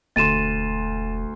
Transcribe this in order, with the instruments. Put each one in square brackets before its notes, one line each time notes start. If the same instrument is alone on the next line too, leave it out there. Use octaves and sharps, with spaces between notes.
[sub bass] E1 [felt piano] D2 C6 [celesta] A6 D#7 E7